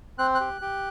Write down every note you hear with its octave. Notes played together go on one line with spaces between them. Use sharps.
C4 F#6
F#6
G4
G4